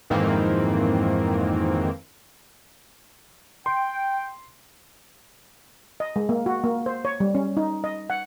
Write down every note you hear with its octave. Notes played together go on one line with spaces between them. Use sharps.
F2 G#2 D#3 E3 A#3 C4
G5 C6
D#5
G#3
A#3
F#4
A#3
C5
C#5
G3
C#4
D#4
D#5
F#5